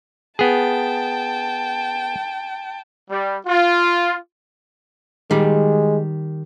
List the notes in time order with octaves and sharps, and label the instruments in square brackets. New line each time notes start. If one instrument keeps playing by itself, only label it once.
[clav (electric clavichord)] B3 G#4 [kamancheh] G5 A5
[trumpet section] G3
F4
[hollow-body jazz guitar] D#3 G3 [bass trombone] G#3